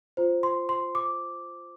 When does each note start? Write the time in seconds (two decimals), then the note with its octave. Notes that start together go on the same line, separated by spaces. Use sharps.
0.17 F4 C5
0.43 C6
0.69 C6
0.95 D6